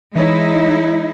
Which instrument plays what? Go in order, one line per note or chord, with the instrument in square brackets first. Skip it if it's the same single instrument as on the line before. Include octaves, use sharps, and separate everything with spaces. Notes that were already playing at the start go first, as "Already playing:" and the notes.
[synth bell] E3 C#5 [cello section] G#3 D#4 E4